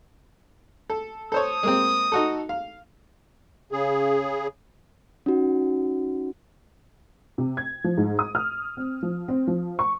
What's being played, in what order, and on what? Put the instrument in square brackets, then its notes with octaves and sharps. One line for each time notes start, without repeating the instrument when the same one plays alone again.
[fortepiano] A4
[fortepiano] A4 C5 C#5 [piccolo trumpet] D#6
[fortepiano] G#3 A#3 C4
D#4 F#4 A4
F5
[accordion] C#3 G#4
[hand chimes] C#4 D#4 F#4
[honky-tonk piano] C3
G#6
F3
G#2
D#6
F6
C4
F3
C4
F3
C#6